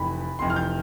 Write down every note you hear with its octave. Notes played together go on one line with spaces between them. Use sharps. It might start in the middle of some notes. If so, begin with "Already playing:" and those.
Already playing: F1 F2 E3 B5
F1 F2 E3 C6
F6
G6